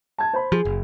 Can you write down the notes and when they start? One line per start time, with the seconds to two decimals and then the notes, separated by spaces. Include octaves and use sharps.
0.18 A5 G#6
0.33 C5 B5
0.52 F3 G#4
0.65 F#1